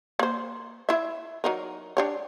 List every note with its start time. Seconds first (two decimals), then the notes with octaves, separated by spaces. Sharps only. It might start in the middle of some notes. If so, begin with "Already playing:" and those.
0.19 A#3 C5
0.89 E4 E5
1.44 F#3 D#4 A#4
1.97 D4 G4 C#5